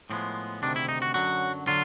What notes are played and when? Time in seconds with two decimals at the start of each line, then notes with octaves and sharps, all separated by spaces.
0.10 A2 F3 G#3 B3 C4
0.62 D2 C3 D#3 D4
0.76 E4
0.89 D#4
1.02 F#4
1.14 F#2 D3 F#3 F#4
1.67 D3 F#3 F4